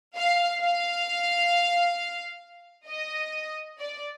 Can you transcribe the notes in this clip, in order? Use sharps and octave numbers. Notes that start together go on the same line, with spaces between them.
F5
F5
D#5
D5